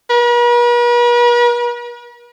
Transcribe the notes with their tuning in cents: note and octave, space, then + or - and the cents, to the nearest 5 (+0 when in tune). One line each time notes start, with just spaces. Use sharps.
B4 -45